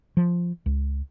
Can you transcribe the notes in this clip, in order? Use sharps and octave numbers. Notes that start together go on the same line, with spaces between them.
F3
C#2